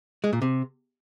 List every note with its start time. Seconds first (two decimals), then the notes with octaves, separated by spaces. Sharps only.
0.24 G#3
0.33 A#2
0.42 C3